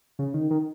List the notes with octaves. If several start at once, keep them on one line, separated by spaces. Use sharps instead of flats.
C#3
D#3
D#3